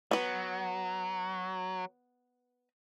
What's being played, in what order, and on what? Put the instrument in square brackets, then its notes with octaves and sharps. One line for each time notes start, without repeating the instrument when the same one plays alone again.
[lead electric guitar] F#3 [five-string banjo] B3 B4